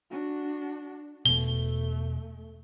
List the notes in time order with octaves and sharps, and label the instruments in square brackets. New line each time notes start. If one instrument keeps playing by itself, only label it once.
[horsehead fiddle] D4 F#4
[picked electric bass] E1 B2 [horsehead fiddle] A3 [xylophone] G7